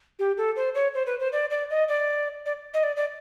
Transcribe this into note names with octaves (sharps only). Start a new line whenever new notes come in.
G4
A4
C5
C#5
C5
B4
C5
D5
D5
D#5
D5
D5
D#5
D5
D5